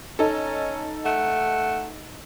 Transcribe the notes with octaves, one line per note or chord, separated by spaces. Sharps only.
C#4 D#4 A4
A3 F#5